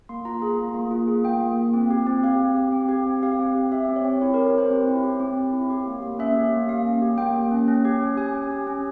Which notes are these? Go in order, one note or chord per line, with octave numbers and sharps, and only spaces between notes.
A#3 C6
F4 A#5
G#4
A#3
A#3
F4
G#4
A#3 G5
A#3
F4
C4
G4
C4
G4 F5
C4
G4
C4
G4
C4
G4 F5
C4
G4
G4 E5
C4
C#5
C4
E4 C#5
G4 A#4
A#4
C4 C5
C4 C#5
E4
G4
C4
C4
E4
G4
A#3
A#3
C#4 E5
G4
A#3
A#3 F5
C#4
G4
A#3 G5
A#3
C#4
C#4
G4
C#4
G4 G#5
C#4
G4
C#4